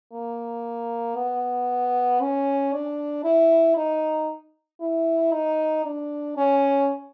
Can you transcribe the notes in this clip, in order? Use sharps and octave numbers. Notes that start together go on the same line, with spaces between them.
A#3
B3
C#4
D4
E4
D#4
E4
D#4
D4
C#4